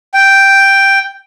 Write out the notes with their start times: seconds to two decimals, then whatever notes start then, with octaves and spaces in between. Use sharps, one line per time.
0.14 G5